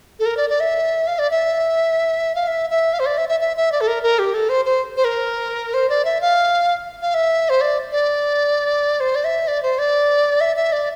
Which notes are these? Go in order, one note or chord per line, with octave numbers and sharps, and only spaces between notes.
A4
A#4
D5
D5
E5
F5
D5
E5
F5
E5
E5
F5
C5
D5
E5
E5
E5
E5
D5
A4
A#4
A#4
G4
A4
C5
C5
C5
A#4
C5
D5
E5
F5
F5
E5
C5
D5
D5
C5
D5
E5
D5
C5
D5
E5
E5
D5